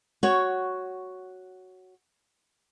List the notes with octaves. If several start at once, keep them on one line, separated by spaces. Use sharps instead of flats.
F#4 C#5